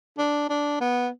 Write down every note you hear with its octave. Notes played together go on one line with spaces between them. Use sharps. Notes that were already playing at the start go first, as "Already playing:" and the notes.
D4
D4
B3